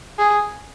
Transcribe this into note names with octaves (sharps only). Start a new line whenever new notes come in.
G#4